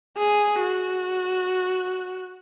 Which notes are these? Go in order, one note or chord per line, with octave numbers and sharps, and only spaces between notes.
G#4
F#4